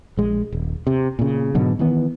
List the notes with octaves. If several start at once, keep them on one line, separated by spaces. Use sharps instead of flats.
A#1 G#3
D#1
C3
A#2 C#3
G#2 B2 D3 F#3
D#3 E3 B3